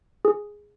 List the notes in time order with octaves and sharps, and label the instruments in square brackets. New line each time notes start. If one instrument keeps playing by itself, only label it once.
[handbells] G#4